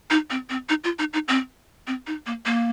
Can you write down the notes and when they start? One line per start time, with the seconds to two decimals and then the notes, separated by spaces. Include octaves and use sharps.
0.11 D#4
0.30 C4
0.50 C4
0.69 D#4
0.84 F4
0.99 D#4
1.13 D#4
1.28 C4
1.87 C4
2.07 D#4
2.26 A#3
2.46 A#3